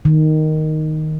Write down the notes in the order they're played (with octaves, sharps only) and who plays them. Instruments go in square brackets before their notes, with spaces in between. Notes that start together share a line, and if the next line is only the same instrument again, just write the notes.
[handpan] D#3